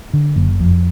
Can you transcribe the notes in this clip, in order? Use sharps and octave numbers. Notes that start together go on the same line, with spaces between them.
D3
F#1
F2